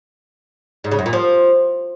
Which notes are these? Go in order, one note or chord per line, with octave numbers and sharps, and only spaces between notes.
G#2
C#3
F#2
A#2
F3